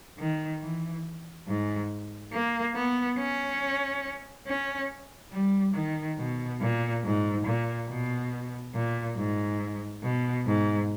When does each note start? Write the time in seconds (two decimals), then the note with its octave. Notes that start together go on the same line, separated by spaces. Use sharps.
0.19 D#3
0.62 E3
1.48 G#2
2.33 A#3
2.75 B3
3.19 C#4
4.47 C#4
5.33 G3
5.75 D#3
6.18 B2
6.61 A#2
7.04 G#2
7.46 A#2
7.90 B2
8.75 A#2
9.17 G#2
10.03 B2
10.46 G#2